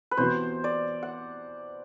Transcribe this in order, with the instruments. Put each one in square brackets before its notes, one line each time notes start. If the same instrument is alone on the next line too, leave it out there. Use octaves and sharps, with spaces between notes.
[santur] B4
[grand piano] C3 E3 B3 F#4 [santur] C5
[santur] D5
F#5